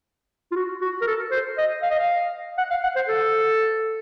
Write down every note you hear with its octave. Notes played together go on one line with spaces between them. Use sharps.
F4
F#4
F#4
A#4
A4
C5
D#5
F5
D#5
F5
F#5
F5
F#5
C5
A4